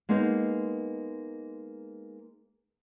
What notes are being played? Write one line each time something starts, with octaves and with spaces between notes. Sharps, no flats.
G#3 A#3 B3 D#4